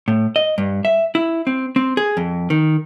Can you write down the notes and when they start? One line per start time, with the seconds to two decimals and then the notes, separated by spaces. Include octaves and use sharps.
0.08 A2
0.36 D#5
0.58 G2
0.85 E5
1.15 E4
1.47 C4
1.76 C4
1.97 G#4
2.17 F2
2.50 D#3